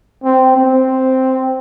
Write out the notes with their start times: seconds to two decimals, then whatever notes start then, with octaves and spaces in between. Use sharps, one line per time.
0.24 C4
0.56 C4